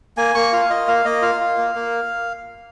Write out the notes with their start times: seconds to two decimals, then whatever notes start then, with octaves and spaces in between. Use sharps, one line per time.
0.17 A#3 G#5
0.35 A#3 C#6
0.52 F4 F5
0.70 F4 D#5
0.88 A#3 F5
1.05 A#3 D#5
1.22 F4 F5
1.41 F4
1.58 A#3
1.75 A#3